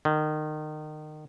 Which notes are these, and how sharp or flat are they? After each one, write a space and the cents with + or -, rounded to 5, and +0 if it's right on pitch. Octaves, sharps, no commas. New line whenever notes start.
D#3 -25